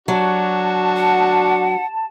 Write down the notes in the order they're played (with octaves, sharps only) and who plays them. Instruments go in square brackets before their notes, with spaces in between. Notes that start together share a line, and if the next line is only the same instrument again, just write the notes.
[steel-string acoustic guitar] F#3 [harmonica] D4 F#4 [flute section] A5
[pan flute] F#5